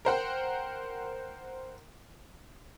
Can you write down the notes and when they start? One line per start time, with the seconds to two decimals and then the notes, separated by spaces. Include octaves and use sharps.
0.05 A#4 C5 F#5 G5